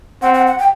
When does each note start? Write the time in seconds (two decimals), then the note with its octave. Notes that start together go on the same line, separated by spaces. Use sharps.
0.22 C4 F#5
0.34 F#5
0.47 F#5
0.59 G5